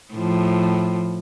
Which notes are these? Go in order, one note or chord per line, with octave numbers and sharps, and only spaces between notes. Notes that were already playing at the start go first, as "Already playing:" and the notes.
A2 F3